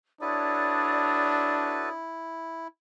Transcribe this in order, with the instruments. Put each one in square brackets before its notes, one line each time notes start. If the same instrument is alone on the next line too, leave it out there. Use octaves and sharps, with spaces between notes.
[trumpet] D4 [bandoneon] E4 [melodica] F#4 A4 B4 [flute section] C#5 D5 D#6